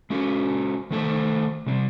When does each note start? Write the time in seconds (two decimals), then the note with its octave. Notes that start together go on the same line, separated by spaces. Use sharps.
0.10 G#3 C#4 F#4 A4
0.91 D#3 A3 A4 C5
1.66 C3 G3 C4